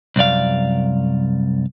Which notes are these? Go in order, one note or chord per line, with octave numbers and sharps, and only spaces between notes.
C2 F#2 D5 F5